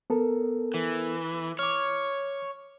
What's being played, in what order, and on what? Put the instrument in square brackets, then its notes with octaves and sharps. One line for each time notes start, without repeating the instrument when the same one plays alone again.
[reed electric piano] B3 A4 A#4
[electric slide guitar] E3
[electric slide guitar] C#5 [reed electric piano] D6 F6